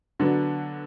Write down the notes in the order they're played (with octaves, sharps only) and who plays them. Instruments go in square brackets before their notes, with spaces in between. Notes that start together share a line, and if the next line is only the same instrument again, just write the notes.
[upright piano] D3 F#3 B3 D4